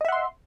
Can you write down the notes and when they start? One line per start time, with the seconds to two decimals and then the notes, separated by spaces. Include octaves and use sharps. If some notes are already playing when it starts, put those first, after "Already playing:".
0.01 D#5
0.05 E5
0.08 F#5
0.12 C6